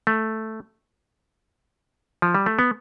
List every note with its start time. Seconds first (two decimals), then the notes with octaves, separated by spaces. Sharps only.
0.07 A3
2.22 F3
2.35 G3
2.46 A3
2.59 B3